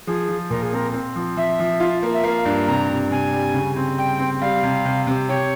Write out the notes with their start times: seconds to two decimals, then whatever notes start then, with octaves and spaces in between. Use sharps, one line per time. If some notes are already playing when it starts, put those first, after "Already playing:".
0.07 F3 G#4
0.28 F3
0.50 A#2 A#4
0.62 G#4
0.72 C4 A#4
0.93 C4
1.16 F3
1.37 F3 E5
1.59 F3
1.80 F4
2.03 A#3
2.14 E5
2.23 A#3 F5
2.45 G2
2.67 C3 A#5
2.90 C3
3.11 C3 G#5
3.33 G3
3.54 C#3
3.76 C4
3.98 G3 G5
4.19 C4
4.41 G3 F5
4.63 C3
4.85 C3
5.07 C3
5.29 G4 C#5